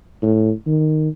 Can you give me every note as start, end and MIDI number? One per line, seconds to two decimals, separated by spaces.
0.22 0.51 45
0.66 1.09 51